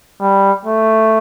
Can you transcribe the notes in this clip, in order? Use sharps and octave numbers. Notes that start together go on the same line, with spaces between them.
G3
A3